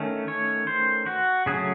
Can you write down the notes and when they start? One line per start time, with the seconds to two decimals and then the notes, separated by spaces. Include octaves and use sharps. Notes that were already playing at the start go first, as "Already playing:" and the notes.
Already playing: D#3 A3 C#4
0.28 C#5
0.67 C5
1.06 F#4
1.46 C#3 F#3 A3 C#4 G#4